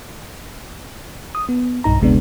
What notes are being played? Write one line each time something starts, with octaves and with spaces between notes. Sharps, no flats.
D#6
B3
B1 G2 D#4 A#5
G1 D2 C3 G#3 B3 D4